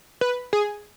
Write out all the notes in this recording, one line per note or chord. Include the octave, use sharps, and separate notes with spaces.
B4
G#4